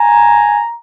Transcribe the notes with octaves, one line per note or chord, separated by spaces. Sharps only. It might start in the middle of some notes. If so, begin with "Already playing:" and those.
Already playing: G#5 A#5